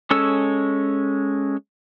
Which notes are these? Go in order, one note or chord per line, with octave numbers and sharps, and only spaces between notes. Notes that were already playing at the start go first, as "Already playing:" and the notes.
G#3 C#4 A4 C#5 E6